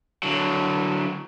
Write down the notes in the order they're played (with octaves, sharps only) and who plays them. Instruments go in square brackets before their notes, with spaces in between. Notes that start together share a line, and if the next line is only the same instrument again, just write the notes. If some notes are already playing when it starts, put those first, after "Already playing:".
[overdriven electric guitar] D3 F#3